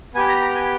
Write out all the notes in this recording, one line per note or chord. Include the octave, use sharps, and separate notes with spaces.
B3 G4 G#5
A#5
A#5
G#5